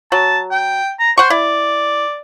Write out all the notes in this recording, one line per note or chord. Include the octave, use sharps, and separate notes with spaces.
F#3 A5
G5
A#5
C5 F#5 C#6
E4 D5